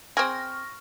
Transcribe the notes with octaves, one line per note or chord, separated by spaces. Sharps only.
C4 G#4 C#6 F6 A#6